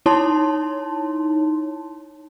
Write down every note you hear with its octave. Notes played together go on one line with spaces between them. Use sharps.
D#4 E4 C#5 A5 C6